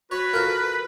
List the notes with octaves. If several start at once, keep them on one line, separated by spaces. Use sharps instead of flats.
F#4 B4 C#5
F4 A4 A#4